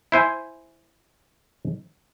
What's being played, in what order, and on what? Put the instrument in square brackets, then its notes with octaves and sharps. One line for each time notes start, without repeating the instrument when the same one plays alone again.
[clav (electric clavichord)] E4 C5 G#5